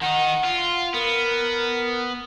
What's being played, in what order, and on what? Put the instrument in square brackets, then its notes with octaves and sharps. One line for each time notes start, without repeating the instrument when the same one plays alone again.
[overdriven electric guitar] D#3 D#4 [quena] F#5
[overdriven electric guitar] F4
[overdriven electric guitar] B3 [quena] A#4